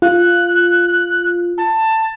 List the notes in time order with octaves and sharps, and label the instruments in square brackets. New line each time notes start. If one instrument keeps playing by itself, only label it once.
[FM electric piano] F4 [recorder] F#6
[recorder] A5